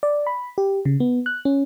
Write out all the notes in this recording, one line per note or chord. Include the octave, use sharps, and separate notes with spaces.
D5
B5
G4
C#3
B3
F#6
C#4